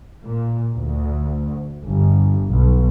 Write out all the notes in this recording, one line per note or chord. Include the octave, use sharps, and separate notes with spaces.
A#2
D2
G1
B1